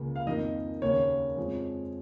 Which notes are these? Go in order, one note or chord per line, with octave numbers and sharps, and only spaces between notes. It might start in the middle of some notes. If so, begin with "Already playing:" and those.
Already playing: C#2 C#3 A#3
F5
F2 D#3 A#3 D#5
D#2 C#3 A#3 C#5
F2 F3 G#3